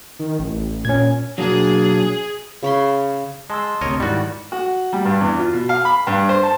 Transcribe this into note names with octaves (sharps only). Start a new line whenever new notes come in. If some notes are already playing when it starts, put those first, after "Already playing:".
D#3
A1
A#2 C#4 G#6
B1 F#3 A#3 D4 G#4
C#3 C#5 B5 C6
G#3 A5 C6 E6
D2 C3 A#4 C#5 D#5
G#2 D#3 G3 E4 F#4 D5
F#4
G3
G2
E2
F4
B2
F5
B5
G2
C5
A5